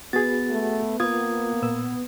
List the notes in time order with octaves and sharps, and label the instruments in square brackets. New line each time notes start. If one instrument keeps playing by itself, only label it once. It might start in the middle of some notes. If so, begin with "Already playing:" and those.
[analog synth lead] B3 [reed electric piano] F#4 G#4 [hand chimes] A6
[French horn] A3
[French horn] A#3 [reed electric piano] F4 B4 [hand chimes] D#6 G#6
[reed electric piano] A#2 B4 E6